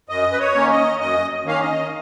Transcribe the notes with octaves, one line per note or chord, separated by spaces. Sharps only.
F#2 D#5
B4
C#5
D#3 A#3 C#4
D#5
F#2 D#5
D#3 A#3 C#4 F5
D#5